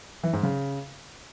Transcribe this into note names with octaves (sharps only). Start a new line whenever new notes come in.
E3
G#2
C#3